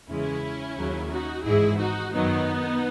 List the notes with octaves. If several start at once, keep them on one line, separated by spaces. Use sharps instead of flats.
E2 C#3 E3 G#3 C#4 E4
D#2 C#3 F#3
D#4 F#4
G#1 G#2 E3 E4 G#4
D#4 F#4
F#2 D#3 F#3 B3 D#4